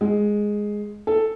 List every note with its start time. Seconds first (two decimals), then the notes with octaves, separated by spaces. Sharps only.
0.01 G#3
1.07 A4